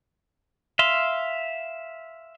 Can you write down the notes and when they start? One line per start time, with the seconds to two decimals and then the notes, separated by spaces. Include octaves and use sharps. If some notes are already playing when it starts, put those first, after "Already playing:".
0.79 E5 F5 C6